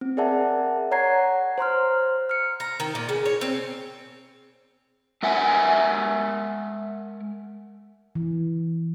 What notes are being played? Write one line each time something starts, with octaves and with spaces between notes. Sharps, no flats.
C4
G#4 A#4 D5 E5 F#5 A5
C#5 F#5 A#5 G#6 C7
C5 A#5 C6 F6
F6 C#7
A#5
D#3
A#2
C#3
C#5
C4
G#3 A#4 E5 F#5 G#5
E3